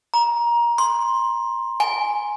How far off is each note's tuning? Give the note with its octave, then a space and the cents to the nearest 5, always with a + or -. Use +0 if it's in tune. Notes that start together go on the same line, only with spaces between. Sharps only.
A#5 +20
C6 +15
G#5 +5